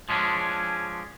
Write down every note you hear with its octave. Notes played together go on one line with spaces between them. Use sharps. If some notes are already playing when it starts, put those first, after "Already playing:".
F3 G#3 C#4 D4